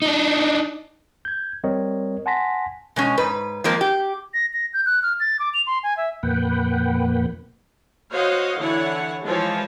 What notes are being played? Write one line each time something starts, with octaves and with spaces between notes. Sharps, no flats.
D4 D#4
G6 G#6
G3 C4 A#4 C#5 D#5
F#5 G#5 A5 C6 A#6 B6
B2 G#3 C#4
G#2 B4
F3 G#3 A#3 C4
G4
A#6
A#6
G6
F#6
F6
A6
D6
F7
C6
G#5
E5
F2 A#2 A#3 B4 F#5 G5
F#4 C5 C#5 D#5 F5 F#5
D3 E3 E4 C#5 F#5
E3 F3 G#3 F4 C#5 A5